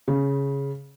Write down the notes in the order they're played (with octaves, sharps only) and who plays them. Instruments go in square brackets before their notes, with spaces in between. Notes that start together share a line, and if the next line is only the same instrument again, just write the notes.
[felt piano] C#3